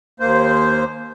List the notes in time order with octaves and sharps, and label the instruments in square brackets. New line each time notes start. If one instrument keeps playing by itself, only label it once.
[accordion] D#2 A#3 C5